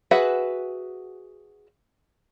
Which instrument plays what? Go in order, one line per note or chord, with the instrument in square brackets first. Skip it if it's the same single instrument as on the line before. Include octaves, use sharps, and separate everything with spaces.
[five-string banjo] F#4 G#4 B4 E5 F#5